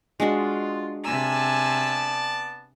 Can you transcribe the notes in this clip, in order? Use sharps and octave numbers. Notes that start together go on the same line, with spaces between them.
G#3 D4 F4 F#4
C3 B3 D5 G#5 A5 E6